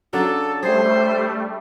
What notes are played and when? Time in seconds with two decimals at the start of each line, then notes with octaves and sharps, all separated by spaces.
0.13 C#3 F#3 D4 A4
0.63 G3 A3 G#4 C5